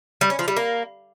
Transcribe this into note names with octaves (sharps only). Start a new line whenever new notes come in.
G3
C#4
F3
G3
A#3